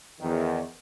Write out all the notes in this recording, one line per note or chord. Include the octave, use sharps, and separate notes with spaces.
E2 D#3